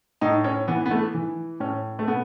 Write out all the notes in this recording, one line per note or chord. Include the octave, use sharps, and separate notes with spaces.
A2 D#4
C#4
E3 B3
B3
A3
E3
A2 C#4
A3
B2 B3